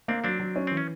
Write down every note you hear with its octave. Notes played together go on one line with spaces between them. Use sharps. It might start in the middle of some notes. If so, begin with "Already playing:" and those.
A#3 C4 D4
F#3 C4 D4
F#3
C#4
E3 C4
C#4